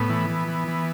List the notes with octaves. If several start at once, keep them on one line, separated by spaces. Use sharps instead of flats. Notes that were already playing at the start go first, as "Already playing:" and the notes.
Already playing: A2 B3
E3
E3
E3
E3